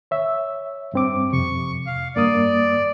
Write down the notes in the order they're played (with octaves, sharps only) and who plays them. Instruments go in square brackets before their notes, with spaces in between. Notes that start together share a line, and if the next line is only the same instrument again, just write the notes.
[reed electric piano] C#5 E5
G2 C4 D6
[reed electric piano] F2 C3 [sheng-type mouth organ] C#6
[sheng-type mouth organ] F5
[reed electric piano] G2 A#3 D#6 [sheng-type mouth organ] D5